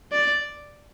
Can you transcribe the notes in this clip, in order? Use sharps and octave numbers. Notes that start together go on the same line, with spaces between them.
D5